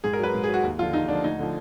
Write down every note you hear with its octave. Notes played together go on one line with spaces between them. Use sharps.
G#2 G#4
A#4
F#3 B4
G#2
G#4
F#3
F#4
D#2
D3 F3 F4
D#2 D#4
D3 F3 D4
D2 D#4
D3 F3